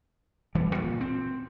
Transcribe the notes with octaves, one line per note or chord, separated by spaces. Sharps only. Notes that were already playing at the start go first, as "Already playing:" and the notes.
E1 E3 G3
A#2
C4